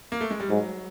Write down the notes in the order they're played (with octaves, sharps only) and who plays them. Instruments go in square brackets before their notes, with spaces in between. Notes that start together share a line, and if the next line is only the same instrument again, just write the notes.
[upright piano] A#3
A3
G#3
G3
[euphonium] G#2 [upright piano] F#3